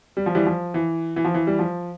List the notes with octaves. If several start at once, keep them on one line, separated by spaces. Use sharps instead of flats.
G3
F3
E3 G3
F3
E3
E3
F3
E3
G3
F3